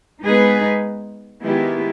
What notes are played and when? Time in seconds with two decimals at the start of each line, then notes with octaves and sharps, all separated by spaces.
0.23 G#3 B3 D#4 G#4 B4
1.42 D#3 G#3 B3 E4 G4